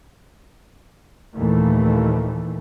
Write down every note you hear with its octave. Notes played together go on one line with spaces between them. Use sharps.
D#2 A#2 E3 A3